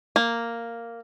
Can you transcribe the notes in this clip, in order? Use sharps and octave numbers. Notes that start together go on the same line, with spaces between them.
A#3